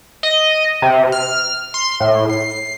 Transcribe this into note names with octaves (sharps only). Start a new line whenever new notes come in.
D#5
C3
F6
C6
A2
C7